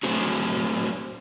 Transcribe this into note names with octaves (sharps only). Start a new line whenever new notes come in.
F#3 A3 C4 G#4 A4 C5